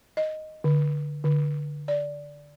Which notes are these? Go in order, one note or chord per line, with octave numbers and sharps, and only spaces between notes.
D#5
D3
D3
D5